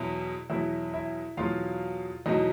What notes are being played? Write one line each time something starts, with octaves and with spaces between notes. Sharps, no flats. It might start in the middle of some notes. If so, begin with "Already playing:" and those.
Already playing: E2 B2 F#3 E4
E2 B2 F#3 E4 E5
E4 E5
E2 B2 F#3 F4 F5
E2 B2 F#3 D#4 D#5